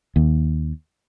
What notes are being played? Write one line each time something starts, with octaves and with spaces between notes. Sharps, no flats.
D#2